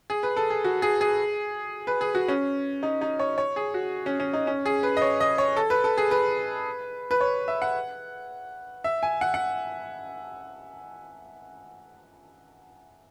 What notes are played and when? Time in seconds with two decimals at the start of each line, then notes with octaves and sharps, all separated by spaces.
0.10 G#4
0.23 B4
0.37 A4
0.50 G#4
0.64 F#4
0.82 G#4
1.01 G#4
1.87 B4
2.01 G#4
2.15 F#4
2.28 C#4
2.83 D#4
3.01 D#4
3.19 C#5
3.38 C#5
3.56 G#4
3.74 F#4
4.06 C#4
4.20 C#4
4.33 D#4
4.47 C#4
4.66 G#4
4.83 B4
4.97 D#5
5.02 C#5
5.20 D#5
5.38 C#5
5.56 A4
5.70 B4
5.84 A4
5.98 G#4
6.11 B4
7.11 B4
7.21 C#5
7.48 E5
7.62 F#5
8.84 E5
9.03 G#5
9.21 F#5
9.34 F#5